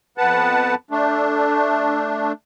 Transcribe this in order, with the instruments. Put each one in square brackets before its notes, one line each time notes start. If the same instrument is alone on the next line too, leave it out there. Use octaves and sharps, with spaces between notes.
[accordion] F2 B3 B4 F#5 A5
A3 D4